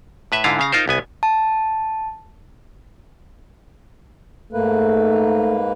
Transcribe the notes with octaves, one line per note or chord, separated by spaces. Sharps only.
A2 B4 E5
G#2 D3 E4 F4 F5 A#5
C#3 F5 A#5
D#4 F4 A#4 C5
C2 B3 G#5
A5
G#2 A3 A#3 B4